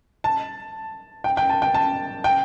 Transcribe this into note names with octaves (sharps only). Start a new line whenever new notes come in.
A5
G5
G5
A5
G5
A5
G5